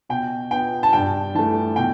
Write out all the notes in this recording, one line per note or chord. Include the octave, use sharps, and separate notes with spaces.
B2 G5
B3 G5
A5
G2 G5
E3 A3 A5
B2 G5